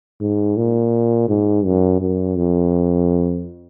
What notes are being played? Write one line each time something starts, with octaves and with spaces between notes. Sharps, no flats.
G#2
A#2
G#2
F#2
F#2
F2